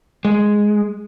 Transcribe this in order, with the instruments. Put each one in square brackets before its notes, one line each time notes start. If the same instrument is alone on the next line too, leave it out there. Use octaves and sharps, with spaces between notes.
[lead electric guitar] G#3